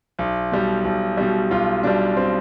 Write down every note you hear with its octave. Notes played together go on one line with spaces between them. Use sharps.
B1
B2 G3
B1
B2 G3
B1 F4
B2 G3 D4
C4